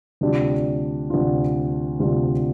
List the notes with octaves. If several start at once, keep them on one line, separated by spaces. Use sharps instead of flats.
D2 C3 G3 D4 F4
D2 C3 G3 D4 F4
D2 C3 G3 D4 F4